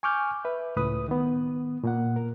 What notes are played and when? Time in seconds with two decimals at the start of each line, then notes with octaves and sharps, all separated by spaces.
0.03 G#5 C#6 D6 F6 G6
0.44 B4 E5
0.76 C#2 A2 B4 D#6
1.08 D#3 B3
1.84 A#2 A#3 F#5
2.16 A#4